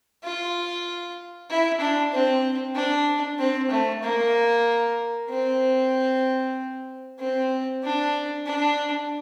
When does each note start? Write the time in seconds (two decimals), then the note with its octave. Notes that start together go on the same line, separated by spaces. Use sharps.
0.23 F4
1.49 E4
1.81 D4
2.12 C4
2.75 D4
3.39 C4
3.70 A3
4.03 A#3
5.29 C4
7.19 C4
7.83 D4
8.46 D4